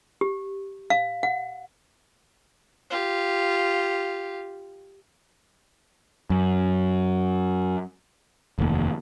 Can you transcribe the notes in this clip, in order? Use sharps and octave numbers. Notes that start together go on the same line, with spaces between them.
G4
F5
F#5
F4 G4
F#2
F1 D#2